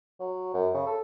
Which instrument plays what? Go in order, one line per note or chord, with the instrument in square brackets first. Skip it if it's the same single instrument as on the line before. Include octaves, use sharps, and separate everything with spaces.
[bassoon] F#3
F#2
C#3
A4